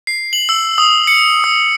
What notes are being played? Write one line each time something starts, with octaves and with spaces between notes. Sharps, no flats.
C7
F#7
E6
D#6
C#7
D#6